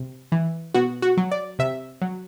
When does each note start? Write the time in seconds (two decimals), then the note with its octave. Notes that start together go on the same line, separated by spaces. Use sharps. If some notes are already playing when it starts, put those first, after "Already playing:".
Already playing: C3
0.32 E3
0.74 B2 F#4
1.02 F#4
1.17 F#3
1.32 D5
1.59 C3 E5
2.02 F#3